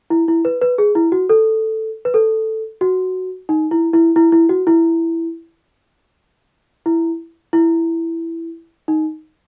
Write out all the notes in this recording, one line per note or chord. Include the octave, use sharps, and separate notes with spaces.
E4
E4
B4
B4
G#4
E4
F#4
A4
B4
A4
F#4
D#4
E4
E4
E4
E4
F#4
E4
E4
E4
D#4